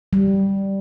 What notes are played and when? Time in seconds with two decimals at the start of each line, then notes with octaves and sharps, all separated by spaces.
0.13 G3